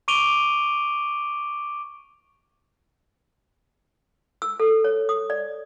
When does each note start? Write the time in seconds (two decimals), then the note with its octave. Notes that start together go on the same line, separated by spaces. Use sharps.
0.08 C#6 D6 D7 D#7 F7 G7
4.42 E6
4.60 A4
4.84 C#5
5.09 D#6
5.30 D5